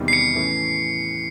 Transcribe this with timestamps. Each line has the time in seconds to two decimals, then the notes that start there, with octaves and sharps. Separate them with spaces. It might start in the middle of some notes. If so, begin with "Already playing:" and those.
Already playing: E2 C3 D#3 G3
0.08 C7
0.13 C#7
0.35 A2 E3 A3 C#4